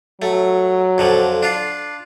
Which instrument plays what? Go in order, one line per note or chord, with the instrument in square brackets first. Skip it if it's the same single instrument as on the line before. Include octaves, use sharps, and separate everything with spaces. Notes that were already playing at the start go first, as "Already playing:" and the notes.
[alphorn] F#3 [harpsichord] A3
[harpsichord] F2 D3 F3
D4 F4